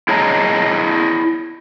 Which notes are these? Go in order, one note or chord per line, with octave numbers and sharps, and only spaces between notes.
E4 G#4 C#5 D#5 A5 A#5